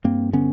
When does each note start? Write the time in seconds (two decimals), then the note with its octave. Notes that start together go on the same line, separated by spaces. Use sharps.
0.04 G2 A#3 C4
0.33 D3 B3 C#4